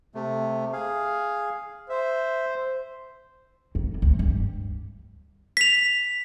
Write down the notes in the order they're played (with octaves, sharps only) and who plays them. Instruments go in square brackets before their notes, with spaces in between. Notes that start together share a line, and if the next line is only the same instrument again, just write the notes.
[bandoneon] C3 A3
G#4 F5
[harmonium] C5 [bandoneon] E5
[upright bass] F2
D2
G2
[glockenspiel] B6 F7